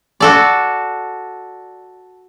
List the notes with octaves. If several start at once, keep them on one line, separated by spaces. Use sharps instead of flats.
F#4 A4 D5